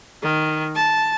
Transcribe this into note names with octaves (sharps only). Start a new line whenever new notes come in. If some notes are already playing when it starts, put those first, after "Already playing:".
D#3
A5